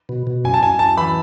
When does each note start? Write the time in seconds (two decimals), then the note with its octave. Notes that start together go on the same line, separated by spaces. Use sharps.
0.09 B2
0.27 B2
0.44 F#2 G#5
0.54 A5
0.62 F#2 G#5
0.79 F#2 A5
0.97 E3 B5